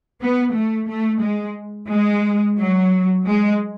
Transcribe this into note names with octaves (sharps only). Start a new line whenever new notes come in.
B3
A3
A3
G#3
G#3
F#3
G#3